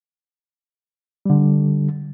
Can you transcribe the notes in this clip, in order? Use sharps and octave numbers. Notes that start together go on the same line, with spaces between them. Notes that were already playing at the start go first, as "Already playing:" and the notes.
D3 G3